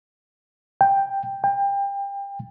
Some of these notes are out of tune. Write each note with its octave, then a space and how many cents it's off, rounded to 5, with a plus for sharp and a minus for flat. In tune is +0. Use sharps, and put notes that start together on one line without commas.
G5 +5
G5 +25